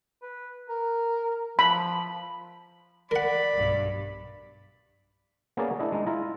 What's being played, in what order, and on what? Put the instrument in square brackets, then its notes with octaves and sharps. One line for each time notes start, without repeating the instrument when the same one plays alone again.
[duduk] B4
A#4
[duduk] F3 [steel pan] B5
[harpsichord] A#4 F#5 [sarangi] D5 [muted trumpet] B5
[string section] B1 G2
[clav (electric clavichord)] A#3 B3 C#4 G#4 A#4 D5
D4 E4 D#5
G#3 D#4
E4 F4 A#5